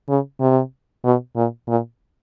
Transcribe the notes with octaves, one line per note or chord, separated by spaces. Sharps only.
C#3
C3
B2
A#2
A#2